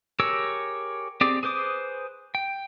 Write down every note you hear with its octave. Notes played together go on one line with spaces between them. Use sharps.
G4 G#4 A#4 C#5 E6
C4 G4 G#4 D5
G#4 B4 C5 D6 D#6
G5